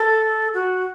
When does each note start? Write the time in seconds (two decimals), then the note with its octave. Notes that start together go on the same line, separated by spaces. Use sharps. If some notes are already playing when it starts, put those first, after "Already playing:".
Already playing: A4
0.54 F#4